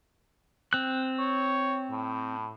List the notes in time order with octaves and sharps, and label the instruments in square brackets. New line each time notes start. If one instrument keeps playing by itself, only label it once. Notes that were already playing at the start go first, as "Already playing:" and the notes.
[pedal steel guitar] C4 F#6
[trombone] C#5
A2